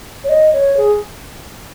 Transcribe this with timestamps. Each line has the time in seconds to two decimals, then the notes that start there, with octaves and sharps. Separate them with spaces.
0.24 C#5
0.29 D#5
0.53 C#5
0.77 G#4